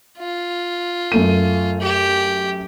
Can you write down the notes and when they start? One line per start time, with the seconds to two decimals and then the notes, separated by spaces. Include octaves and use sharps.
0.19 F4
1.12 F#2 A3 D#7
1.81 G4